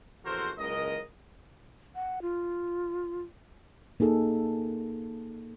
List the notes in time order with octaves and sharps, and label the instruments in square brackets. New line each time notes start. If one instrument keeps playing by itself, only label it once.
[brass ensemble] A#1 E2 F#4 A4 A#4 C5
F#1 C#2 G#3 A#4 D#5
[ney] F#5
F4
[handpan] A#3 D#4 G#4 A4